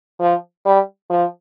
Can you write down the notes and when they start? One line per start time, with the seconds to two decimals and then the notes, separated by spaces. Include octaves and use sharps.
0.20 F3
0.65 G3
1.10 F3